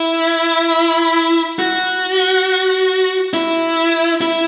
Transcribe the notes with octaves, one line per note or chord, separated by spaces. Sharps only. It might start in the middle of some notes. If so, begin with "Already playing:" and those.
Already playing: E4
F#4
E4
E4